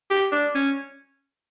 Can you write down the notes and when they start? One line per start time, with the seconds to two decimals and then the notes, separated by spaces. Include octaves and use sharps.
0.11 G4
0.32 D4
0.55 C#4